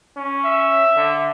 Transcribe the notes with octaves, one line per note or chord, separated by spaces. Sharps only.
C#4
E5
D3